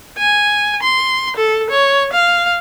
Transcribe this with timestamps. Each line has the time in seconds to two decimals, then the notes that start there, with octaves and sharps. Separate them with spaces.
0.18 G#5
0.83 C6
1.36 A4
1.71 C#5
2.13 F5